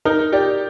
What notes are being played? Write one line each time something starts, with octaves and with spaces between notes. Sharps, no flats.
D#4 A#4
G4 D5